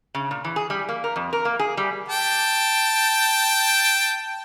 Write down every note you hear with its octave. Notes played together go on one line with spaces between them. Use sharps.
C#3
A#2
E3
G#4
G3
A#3
A#4
F2
A#4
A#3
G#4
G3
G5 A5